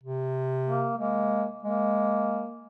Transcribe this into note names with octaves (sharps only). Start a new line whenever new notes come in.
C3
A#3
G#3 A#3
G#3 A#3